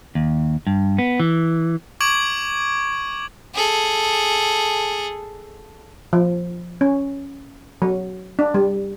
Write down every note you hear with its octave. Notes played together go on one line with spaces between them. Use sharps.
D#2
G2
B3
E3
C#6 D6 G#6 D7 F#7
G#4 A4
F3
C#4
F#3
D4
G3